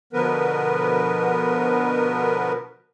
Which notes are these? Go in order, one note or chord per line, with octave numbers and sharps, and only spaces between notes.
B2 D3 F3 B3 A#4 B4